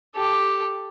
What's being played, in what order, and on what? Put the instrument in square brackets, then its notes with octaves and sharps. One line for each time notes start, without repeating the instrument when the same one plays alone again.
[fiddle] G4 A4